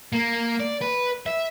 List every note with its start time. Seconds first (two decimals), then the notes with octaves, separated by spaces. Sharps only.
0.13 A#3
0.60 D5
0.82 B4
1.26 E5